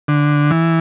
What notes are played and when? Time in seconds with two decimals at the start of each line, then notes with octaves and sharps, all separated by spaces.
0.08 D3
0.51 E3